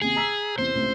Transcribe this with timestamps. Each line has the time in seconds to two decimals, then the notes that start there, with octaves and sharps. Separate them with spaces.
0.02 D#2 C3 G#4
0.16 A#5 E6 B6
0.58 E2 C3 C5
0.75 C#2 A2 C3